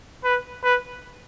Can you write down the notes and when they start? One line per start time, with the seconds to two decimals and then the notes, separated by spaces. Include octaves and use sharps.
0.24 B4
0.64 B4